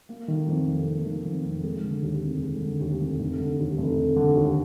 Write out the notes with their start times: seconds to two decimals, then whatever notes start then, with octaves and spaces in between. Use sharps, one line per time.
0.09 A#3
0.28 D#3
0.48 F2
0.67 F1
0.87 A#3
1.06 D#3
1.25 F2
1.44 F1
1.64 G#3
1.84 D3
2.03 D#2
2.23 F1
2.42 G#3
2.62 D3
2.80 D#2
3.01 F1
3.20 F1
3.38 D3
3.59 D#2
3.78 F1
3.97 F1
4.16 D3
4.35 D#2